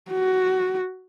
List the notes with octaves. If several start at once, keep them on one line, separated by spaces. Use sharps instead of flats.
F#4